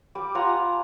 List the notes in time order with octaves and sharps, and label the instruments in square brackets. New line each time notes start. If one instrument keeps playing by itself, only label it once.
[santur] G3 D6
F4 F#5 G#5 A#5